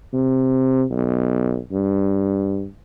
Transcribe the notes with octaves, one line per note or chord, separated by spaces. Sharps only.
C3
B1
G2